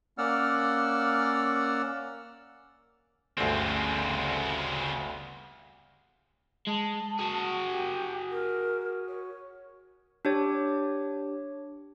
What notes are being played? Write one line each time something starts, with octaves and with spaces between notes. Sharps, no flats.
A#3 C#4 D5 F#5 E6 F6
G1 D2 C#3 C4
G#3 A5
F#4 G#4
G4
A#4
C#5
D4 G4 C#5